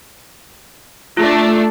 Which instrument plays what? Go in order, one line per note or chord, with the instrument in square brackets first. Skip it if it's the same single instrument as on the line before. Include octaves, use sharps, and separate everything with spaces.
[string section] A3 D4 [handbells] F4